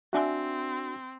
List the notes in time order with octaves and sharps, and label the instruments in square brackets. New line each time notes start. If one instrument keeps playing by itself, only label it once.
[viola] C4 [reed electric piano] D4 F#4 [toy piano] E5 G#5 E6